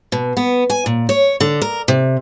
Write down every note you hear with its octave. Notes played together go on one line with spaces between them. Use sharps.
B2
B3
G#5
A#2
C#5
D3
A#4
C3